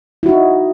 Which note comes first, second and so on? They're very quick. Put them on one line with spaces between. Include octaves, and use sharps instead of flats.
E4 F#4 D#4